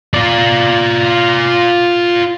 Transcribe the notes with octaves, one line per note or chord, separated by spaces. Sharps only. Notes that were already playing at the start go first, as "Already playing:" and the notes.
F4 D5